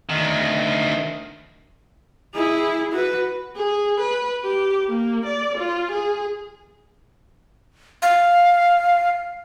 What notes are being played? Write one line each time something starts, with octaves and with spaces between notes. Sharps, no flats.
D2 D#3
E4 G#4
F#4 B4
G#4
B4
G4
A#3
D5
F4
G#4
F5